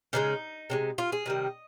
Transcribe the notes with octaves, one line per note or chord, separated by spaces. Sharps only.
C#3 F3 G#3 D#4
C3 F3 G#3
F4
G#4
C3 D#3 G3 D#5